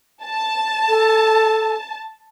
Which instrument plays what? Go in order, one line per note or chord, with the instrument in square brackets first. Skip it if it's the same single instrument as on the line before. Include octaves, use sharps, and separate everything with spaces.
[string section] A5
[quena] A4